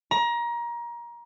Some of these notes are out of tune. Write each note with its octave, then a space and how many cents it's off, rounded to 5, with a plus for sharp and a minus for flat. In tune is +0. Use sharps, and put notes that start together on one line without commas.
A#5 +25